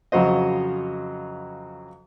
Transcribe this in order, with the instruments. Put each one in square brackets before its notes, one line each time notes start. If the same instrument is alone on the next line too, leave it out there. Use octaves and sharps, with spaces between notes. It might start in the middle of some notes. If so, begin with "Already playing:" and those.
[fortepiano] F2 C#3 F#3 F#4 C5 D#5